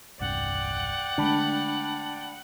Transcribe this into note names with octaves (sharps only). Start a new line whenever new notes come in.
E1 C2 G2 D5 F#5 G5
D3 G#3 A3 D4 A5 B5